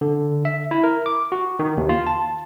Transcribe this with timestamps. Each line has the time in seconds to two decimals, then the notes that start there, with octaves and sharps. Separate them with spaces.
0.01 D3
0.45 E5
0.71 E4
0.84 A#4
1.06 D6
1.32 F#4
1.59 D#3
1.77 D#2
1.89 F4
2.07 A5